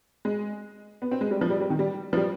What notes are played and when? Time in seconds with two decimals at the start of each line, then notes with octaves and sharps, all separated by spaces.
0.25 G#3
1.02 B3
1.11 C4
1.21 G#3
1.31 G3
1.41 F3
1.50 G3
1.61 G3
1.70 D#3
1.79 G3
2.13 F3
2.17 G3